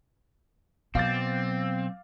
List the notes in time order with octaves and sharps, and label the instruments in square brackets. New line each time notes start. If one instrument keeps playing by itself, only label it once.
[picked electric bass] B2 [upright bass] F#3 [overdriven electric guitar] C4 [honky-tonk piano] F5 D6 A6